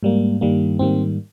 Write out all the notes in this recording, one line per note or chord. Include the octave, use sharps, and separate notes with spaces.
G#2 G3 A#3
G2 D#3 G3 A#3
G#2 D#3 G3 A#3 C4